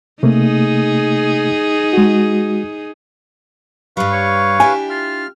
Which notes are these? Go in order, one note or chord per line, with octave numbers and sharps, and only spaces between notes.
C3 A3 A#3 D#4 G#4
G#3 F#4
G2 G3 B4 F5 C#6
C#5
D4 E4 G4 G#5
F4 F6